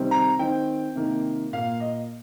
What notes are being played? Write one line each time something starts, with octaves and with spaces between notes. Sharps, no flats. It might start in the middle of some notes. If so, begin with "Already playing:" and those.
Already playing: C3 D#3 G3 C4
A#5
D#3 C4 G5
C3 D#3 A#3
A#2 A#3 F5
D#5